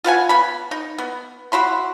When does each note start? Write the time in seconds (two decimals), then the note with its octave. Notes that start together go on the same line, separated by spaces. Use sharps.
0.04 F4 B4 F#5 G#5
0.29 B3 B5
0.71 D#4
0.98 B3
1.52 E4 F#4 B5 C6